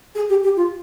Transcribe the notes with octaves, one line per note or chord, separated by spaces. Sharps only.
G#4
G4
G4
F4